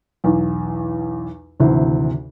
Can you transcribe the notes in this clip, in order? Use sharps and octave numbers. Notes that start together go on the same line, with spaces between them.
B1 E2
G#1 D2 C3 E3